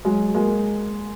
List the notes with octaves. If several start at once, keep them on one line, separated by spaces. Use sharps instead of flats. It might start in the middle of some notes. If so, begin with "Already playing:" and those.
F#3 G#3
G#3 A#3